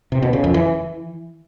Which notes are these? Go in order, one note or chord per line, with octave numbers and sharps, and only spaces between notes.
C3
B2
C#3
F2
E3